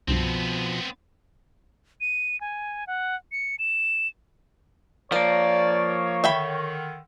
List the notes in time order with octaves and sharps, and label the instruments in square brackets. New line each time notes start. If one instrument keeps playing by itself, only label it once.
[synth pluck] C2 G2 [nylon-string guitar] B2 F3 [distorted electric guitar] B3 C4
[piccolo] D#7
G#5
F#5
C#7
E7
[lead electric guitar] F3 A#3 [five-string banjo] A#4 [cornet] C#5 [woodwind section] D5
[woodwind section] D3 D#3 [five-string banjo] E5 G5 B5